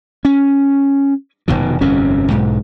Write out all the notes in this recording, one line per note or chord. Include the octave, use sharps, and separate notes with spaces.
C#4
F1 A#1 B2 D#3
G1 F2 C3 C#4
B1 G#2